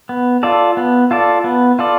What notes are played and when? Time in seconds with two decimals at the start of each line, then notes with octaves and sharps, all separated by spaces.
0.09 B3
0.43 F4 A4 D5
0.77 B3
1.11 F4 A4 D5
1.44 B3
1.79 F4 A4 D5